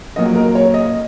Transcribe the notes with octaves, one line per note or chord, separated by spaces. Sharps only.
A#2 F#3 A#3 D#5
A#4
C#5
D#5